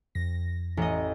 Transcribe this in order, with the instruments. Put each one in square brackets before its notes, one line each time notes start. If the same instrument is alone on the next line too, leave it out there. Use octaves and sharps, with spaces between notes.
[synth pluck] F2 A#6
[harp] A1 D#5